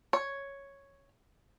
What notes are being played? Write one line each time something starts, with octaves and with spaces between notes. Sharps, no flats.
C#5